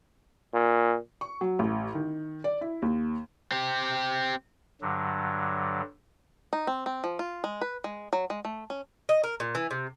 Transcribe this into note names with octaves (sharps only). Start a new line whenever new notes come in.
A#2
C#6
F#3
A1
D#3
D5
E4
D#2
C4 G4
G2 D3 F#3
D#4
C4
C4
F3
F4
G#3
B4
G#3
F#3
G#3
A3
C#4
D#5
A#4
A#2
E3
C3